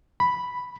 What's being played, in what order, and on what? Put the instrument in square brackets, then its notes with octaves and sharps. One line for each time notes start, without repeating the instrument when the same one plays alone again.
[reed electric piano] B5